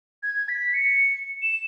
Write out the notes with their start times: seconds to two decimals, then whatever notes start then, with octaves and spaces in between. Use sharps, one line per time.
0.23 G#6
0.49 B6
0.74 C#7
1.42 E7